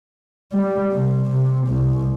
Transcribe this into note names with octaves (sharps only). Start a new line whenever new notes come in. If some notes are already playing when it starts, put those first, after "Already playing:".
G3
C3
C3
C2